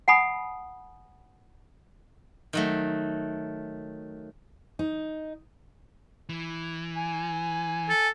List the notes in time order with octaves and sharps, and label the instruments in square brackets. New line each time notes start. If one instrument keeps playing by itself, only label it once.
[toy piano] F#5 G#5 B5 D#6
[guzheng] D#3 F#3 A3
[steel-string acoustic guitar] D#4
[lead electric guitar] E3
[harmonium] G#5
[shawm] A4